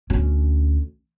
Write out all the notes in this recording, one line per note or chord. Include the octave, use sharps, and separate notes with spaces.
D2 C#4